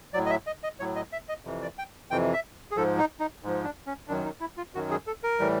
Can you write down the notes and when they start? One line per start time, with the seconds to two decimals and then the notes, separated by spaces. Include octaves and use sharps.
0.13 F#3 D5
0.17 A2
0.26 D#5
0.30 E5
0.47 D#5
0.64 D#5
0.80 A2 F#3 C#5
0.96 D#5
1.13 E5
1.29 D#5
1.45 F2 C3 E3
1.62 D5
1.78 G5
2.11 F2 C3 E3 G5
2.34 E5
2.71 G#4
2.76 G#2 F3 A4
2.99 D#4
3.20 D#4
3.43 G#2 F3
3.64 D4
3.87 C#4
4.08 F#2 D#3 F#3 D4
4.24 D#4
4.40 E4
4.57 F4
4.74 F#2 D#3 F#3 F#4
4.91 G#4
5.07 A4
5.23 A#4
5.39 A2 E3 G3